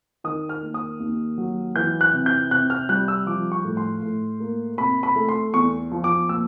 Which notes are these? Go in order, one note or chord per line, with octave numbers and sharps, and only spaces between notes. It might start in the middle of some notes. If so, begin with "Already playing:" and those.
D#3 D#6
F6
A#3
D#6
D#2
F#3
E3 G6
F#6
C3
G6
C3 F#6
F6
G3 F#6
E6
F3 D6
C#6
A2
C6
A2
A#3
C3 B5
B5
A3
C6
E2 C#6
F3
D6
A#2 E6